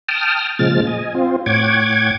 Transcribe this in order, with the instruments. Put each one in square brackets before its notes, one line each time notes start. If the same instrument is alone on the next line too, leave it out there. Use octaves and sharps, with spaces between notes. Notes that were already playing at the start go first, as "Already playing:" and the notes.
[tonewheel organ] G5 A5 D#6 F6
A#2 C#3 F3 G#3 F6 A6
D#5 G#5
C4 F4
A2 C#5 F#5 G5 D6 G#6